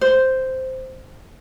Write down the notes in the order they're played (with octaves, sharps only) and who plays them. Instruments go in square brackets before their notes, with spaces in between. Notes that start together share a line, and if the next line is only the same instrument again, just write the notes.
[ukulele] C5